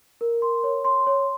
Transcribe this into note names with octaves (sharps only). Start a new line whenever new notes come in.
A#4
C6
C#5
C6
C#5